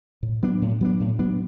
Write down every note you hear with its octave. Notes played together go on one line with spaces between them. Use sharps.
A2
F#3 B3 D4
A2
F#3 B3 D4
A2
F#3 B3 D4